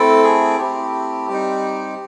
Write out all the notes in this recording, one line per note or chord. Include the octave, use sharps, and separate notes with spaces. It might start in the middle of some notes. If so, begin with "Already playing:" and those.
Already playing: A3 C4 E4 A4
G#4
A3 C4 E4 G4
G3 C4 D#4